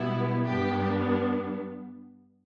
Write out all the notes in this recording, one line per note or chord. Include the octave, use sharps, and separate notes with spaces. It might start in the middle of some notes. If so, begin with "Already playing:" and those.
Already playing: B2 G3 B3 E4
G2 G3 B3 D4 G4